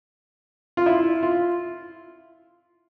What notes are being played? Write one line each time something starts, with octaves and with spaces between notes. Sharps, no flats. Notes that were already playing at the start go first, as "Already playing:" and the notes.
F4
E4
F4